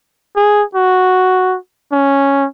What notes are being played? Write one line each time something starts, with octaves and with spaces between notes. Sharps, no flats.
G#4
F#4
C#4